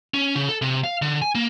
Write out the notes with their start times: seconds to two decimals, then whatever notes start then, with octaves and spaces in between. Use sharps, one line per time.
0.14 C#4
0.36 C#3
0.49 A4
0.62 C3
0.84 F5
1.02 D3
1.22 G#5
1.35 A#3